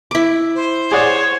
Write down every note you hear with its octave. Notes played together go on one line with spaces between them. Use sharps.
E4 D6
C5
G#4 C#5 D5 F#5